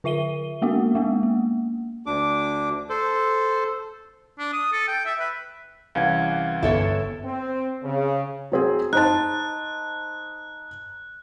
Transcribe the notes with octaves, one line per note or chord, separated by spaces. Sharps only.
D3 F4 E5 D#7 G7
G#3 A#3 B3 F#4
G#3 A#3 B3
A#3
D2 D4 D6
A4 C5
D4
D#6
A4
G5
E5
B4
C2 E3 C#4 F5 F#5 G#6
G1 E4 A4 C#5
C4
C#3
F#3 C4 G#4
D#4 C5 A5 F#6